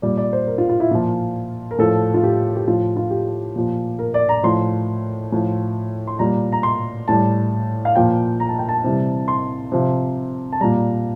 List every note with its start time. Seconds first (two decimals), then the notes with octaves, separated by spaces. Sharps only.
0.02 A#2 G3 D5
0.17 D5
0.33 C5
0.47 A#4
0.58 F4
0.69 F4
0.80 E4
0.91 A#2 F3 F4
1.71 A#4
1.78 A2 F3 A4
2.14 F4
2.23 G4
2.56 G4
2.67 A2 F3 F4
2.97 F4
3.11 G4
3.56 A#2 F3
3.99 A#4
4.14 D5
4.29 A#5
4.43 A2 F3 C6
5.32 A2 F3
6.07 C6
6.19 A#2 G3 A#5
6.52 A#5
6.63 C6
7.08 A2 G3 A5
7.85 F5
7.95 A#2 F3 G5
8.40 A#5
8.49 A5
8.59 G5
8.69 A5
8.84 C3 E3 G3
9.28 C6
9.72 C3 F3
10.53 A5
10.61 A#2 G3 A#5